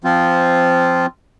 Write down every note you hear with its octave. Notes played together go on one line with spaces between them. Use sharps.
F3 C4 F4